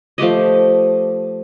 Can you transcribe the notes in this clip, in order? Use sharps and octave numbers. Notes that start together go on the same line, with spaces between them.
F3 A3 G4 D#5